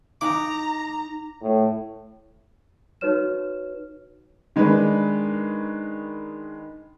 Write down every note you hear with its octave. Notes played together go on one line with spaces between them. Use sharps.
D#4 A#5 D6
A2
D#4 F#4 B4 C#5 F6 E7
D#3 G#3 D4 B4